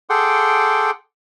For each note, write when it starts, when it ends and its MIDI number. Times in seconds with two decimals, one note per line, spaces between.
0.10 0.91 68
0.10 0.91 69
0.10 0.91 78
0.10 0.91 79
0.10 0.91 84
0.10 0.91 86